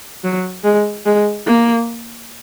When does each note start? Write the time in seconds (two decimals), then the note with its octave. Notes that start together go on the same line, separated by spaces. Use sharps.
0.24 F#3
0.64 G#3
1.06 G#3
1.47 A#3